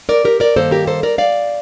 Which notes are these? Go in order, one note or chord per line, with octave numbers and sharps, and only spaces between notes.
A#4 D5
G4 A#4
A#4 D5
G2 D#3 A#3 A4 C5
G4 A#4
A4 C5
A#4 D5
D5 F5